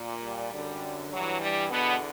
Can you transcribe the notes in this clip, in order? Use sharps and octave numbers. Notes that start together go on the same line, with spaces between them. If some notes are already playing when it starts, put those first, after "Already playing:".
Already playing: A#2
G3
F#2 D3
G2 E3 F#3
G3
E2 B2 D3 B3